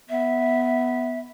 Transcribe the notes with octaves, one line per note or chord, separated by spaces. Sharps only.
B3 E5